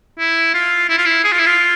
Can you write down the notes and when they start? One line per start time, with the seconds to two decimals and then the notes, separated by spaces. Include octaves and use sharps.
0.19 E4
0.54 F4
0.89 E4
0.98 F4
1.05 E4
1.24 G#4
1.32 F4
1.39 E4
1.46 F4